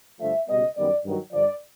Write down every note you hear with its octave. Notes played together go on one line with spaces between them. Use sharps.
G2 D3 F3 A3 E5
C#2 B2 G3 B3 D#5
F#2 D#3 G3 B3 D5
G2 D#3 F#3
G2 D3 F3 D5